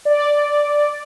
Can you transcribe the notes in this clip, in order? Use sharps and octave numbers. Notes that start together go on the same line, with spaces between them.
D5